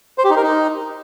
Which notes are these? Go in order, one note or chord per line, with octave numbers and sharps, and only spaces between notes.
C5
G4
D#4
A#4
D#4